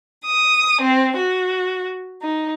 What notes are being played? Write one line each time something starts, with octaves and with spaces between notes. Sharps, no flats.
D#6
C4
F#4
D#4